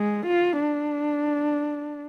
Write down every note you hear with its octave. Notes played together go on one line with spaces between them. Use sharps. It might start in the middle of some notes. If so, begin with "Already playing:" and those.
Already playing: G#3
F4
D4